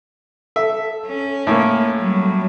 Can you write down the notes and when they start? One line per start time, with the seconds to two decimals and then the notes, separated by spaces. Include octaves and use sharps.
0.56 A4 E5
1.06 C#4
1.47 A2 A#3
1.99 F#3 G3